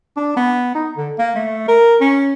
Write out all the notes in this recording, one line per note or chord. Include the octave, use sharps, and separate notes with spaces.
D4
B3
D#4
D3
A#3
A3
A#4
C#4